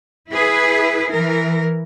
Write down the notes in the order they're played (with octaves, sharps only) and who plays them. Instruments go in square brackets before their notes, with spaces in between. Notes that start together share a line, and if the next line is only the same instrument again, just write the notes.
[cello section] E4 G#4 B4
E3 A#4